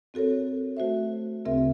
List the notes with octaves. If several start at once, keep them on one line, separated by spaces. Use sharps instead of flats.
C4 F#4 A4 A#4 C#5
A3 F#4 C5 E5
D2 C#3 C4 G#4 A#4 E5